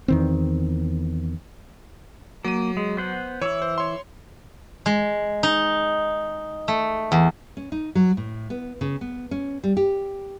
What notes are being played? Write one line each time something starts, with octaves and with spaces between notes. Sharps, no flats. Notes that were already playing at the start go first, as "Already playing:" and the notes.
E2 D#3 C4
F#3 A#3 D#7
G#3
B3 C5 F#5
E3 E4 C#5
C5
C#5 C6
G#3
D#4
A3
E2
C#4
D#4
F#3
A2
B3
C#3
B3
C#4
G3
G4